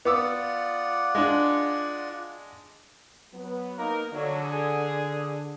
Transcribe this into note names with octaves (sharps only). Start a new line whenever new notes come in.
B3 F4 D5 F#5 D6 E6
G#3 D4
F#3 B3
A#3 D#4 A#4
D3 F#3
G#4